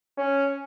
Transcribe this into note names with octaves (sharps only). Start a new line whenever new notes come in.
C#4